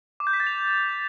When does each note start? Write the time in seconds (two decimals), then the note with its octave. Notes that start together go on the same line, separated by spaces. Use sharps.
0.20 D6
0.27 G6
0.33 B6
0.40 A6
0.47 F7